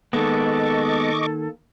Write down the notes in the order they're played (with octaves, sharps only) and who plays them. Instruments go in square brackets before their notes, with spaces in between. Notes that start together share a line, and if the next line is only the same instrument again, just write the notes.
[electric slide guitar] D#3 A#3 [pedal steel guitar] G#3 B3 [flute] A4 [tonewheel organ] D#5 C#6 D6